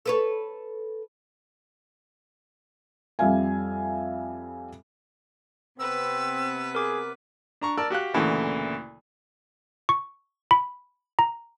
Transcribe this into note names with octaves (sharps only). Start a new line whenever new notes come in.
A4 B4 C#5
F2 G3 E5 F5 G#5
C3 B3 C4 B4 E6
G#4 A#4 D6
D4 A#5 C#6
A#4 D5 A5 E6
F#4 G4 F5 F#6
D2 A#2 C#3 E3 A3
C#6
B5
A#5